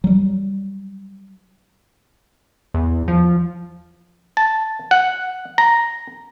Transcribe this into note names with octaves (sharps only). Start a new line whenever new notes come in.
F#3 G3
E2
F3
A5
F#5
A#5